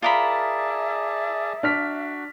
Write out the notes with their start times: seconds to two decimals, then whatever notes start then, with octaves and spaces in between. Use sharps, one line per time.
0.02 F4 G#4 A#4 D5 E5 A5 B5
1.63 D4 F#4 F6 B6